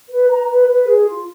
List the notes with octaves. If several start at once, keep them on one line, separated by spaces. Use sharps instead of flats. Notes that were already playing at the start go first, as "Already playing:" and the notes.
B4
B4 A#5
B4
B4
G#4
F4